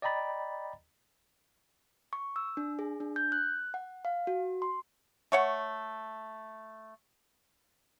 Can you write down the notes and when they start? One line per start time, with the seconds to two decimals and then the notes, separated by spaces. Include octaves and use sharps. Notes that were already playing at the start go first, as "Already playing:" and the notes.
0.02 D5 D#5 G5 A#5 B5 A6
2.13 C#6
2.36 E6
2.57 D4
2.79 G#4
3.00 D4
3.16 G6
3.32 F#6
3.74 F#5
4.05 F5
4.27 F#4
4.62 C6
5.32 A3 C#5 F#5